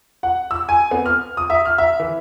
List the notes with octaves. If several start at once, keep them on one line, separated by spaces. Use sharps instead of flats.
F#5
E6
G#5
B3
F6
D#6
E5
F6
E5
E3